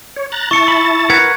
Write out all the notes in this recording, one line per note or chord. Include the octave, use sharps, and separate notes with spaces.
C#5
A#5 F#6 A6
E4 A5 C#6 A6 C#7
B5
A#4 B4 F#5 G#6